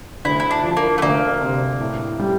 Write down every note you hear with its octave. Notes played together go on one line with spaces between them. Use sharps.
D2 E4
E4
D4
F3
A#3
A3
D2 A#3
C3
A2
G3